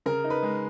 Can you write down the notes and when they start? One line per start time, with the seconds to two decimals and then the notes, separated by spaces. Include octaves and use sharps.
0.06 C#3 A#4
0.24 D#4
0.30 B4
0.43 G#3